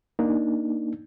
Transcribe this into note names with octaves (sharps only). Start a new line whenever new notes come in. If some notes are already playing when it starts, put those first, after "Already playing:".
A#3 D4 D#4